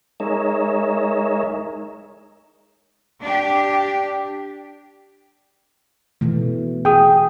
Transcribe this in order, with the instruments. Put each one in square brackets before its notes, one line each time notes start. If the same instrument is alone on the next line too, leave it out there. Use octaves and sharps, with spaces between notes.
[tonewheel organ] G#3 D#4 A#4 C#5 E5
[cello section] D4 G4
[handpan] B2 E3 A3
[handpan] G#4 [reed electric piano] G5 D#6